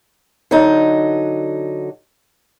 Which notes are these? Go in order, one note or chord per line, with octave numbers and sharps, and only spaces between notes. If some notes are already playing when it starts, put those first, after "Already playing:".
D3 F#3 D#4